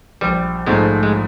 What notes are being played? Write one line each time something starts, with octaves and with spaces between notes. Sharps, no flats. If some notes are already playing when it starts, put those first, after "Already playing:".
A#1 G3
G#2 F3 G#3 A3
G#3